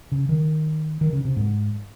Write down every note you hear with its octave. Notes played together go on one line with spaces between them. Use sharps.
C#3
D#3
D#3
C#3
C3
G#2